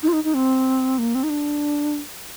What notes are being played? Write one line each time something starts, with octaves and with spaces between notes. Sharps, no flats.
D#4
F4
D#4
D#4
C4
A#3
C4
D#4
D4